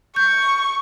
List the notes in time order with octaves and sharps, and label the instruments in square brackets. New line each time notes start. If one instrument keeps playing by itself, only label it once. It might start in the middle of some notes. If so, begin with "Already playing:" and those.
[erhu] C#6 [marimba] G6